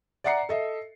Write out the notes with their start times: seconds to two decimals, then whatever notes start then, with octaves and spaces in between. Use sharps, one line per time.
0.24 D5 E5 F#5 A#5 C7 C#7
0.49 A4 D#5 E5